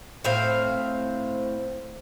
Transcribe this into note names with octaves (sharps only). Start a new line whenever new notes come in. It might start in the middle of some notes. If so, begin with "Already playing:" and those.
A2 C4 F5